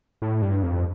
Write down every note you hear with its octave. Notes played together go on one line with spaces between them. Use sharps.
A2
G2
F2